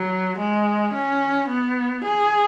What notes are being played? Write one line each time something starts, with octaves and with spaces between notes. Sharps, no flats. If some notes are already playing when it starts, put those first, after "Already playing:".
Already playing: F#3
G#3
C#4
B3
G#4